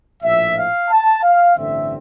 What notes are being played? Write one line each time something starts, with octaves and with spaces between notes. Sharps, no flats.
A#1 A2 F3 E5
F5
A5
F5
A1 G2 D3 A3 C4 E5